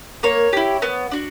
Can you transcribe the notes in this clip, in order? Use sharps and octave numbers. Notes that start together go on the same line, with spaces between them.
A#3 C#5
E4 G4
B3
D4 F#4